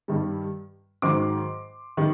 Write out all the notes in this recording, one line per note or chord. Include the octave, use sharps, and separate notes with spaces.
G2 D#3 G3
G#2 D#3 F#3 C6 D6
D#3 G3